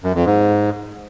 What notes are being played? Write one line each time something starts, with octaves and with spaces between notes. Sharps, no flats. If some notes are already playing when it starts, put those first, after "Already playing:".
F#2
F2
G#2